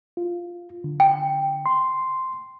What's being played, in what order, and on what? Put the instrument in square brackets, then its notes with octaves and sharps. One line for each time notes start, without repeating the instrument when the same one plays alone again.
[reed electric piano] F4
D3
[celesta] G5
[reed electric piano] C6